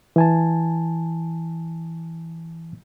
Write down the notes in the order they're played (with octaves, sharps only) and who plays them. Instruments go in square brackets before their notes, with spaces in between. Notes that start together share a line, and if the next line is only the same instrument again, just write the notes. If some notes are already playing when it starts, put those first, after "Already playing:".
[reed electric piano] E3 G#5 A5